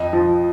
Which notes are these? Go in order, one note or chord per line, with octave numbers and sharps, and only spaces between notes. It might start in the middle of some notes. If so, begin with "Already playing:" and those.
Already playing: F2 D#5
F3